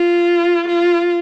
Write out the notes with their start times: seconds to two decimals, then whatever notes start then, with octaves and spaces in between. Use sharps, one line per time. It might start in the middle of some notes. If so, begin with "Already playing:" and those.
Already playing: F4
0.68 F4